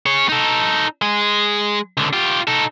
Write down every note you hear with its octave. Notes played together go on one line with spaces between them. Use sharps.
G#4 C#5
D#4 A4
G#3 G#4
C#2 D3
F4 G4
D#4 A4